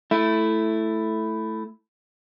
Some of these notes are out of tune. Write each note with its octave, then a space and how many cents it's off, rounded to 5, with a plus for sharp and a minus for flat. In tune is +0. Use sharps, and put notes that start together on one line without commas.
A3 +0 E4 +5